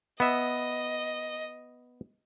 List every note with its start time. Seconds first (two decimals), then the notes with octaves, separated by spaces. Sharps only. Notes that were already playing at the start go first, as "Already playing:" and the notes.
0.20 B3 D#5 E5